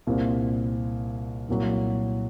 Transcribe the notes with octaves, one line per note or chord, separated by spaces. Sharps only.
C2 A#2 G3 C4
C2 A#2 F#3